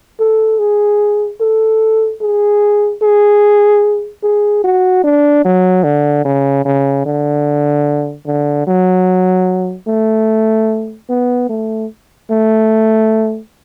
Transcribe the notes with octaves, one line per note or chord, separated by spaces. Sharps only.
A4
G#4
A4
G#4
G#4
G#4
F#4
D4
F#3
D3
C#3
C#3
D3
D3
F#3
A3
B3
A3
A3